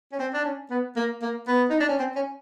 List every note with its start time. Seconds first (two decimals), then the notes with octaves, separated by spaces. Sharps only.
0.12 C#4
0.19 C4
0.33 D4
0.45 C#4
0.71 B3
0.96 A#3
1.22 A#3
1.48 B3
1.70 D#4
1.80 D4
1.89 C#4
1.99 C4
2.16 C#4